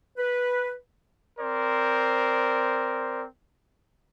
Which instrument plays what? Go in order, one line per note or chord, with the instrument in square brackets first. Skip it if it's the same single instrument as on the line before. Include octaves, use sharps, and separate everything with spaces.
[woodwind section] B4
[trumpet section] C4 A#4 C5 D5